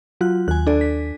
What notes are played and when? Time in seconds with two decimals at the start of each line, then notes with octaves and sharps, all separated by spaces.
0.21 F#3 F4 F#6
0.48 D#2 G#5 F#6
0.67 D4 A4 D5
0.81 B6